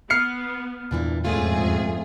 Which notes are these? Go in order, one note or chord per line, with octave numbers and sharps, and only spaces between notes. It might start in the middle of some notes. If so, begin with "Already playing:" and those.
B3 F6 C7 C#7
E2 G2 A#2 E3 D4
F2 G#2 A3 C#4 F4 G#4